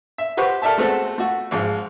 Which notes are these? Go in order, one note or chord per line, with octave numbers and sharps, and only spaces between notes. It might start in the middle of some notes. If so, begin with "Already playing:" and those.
E5
F#4 G4 B4 C5 F#5 C#6
A4 A#4 D5 E5 A5
G#3 A3 B3 C4 F#4 A4
A3 F#4
G#1 G#2 F3 G#3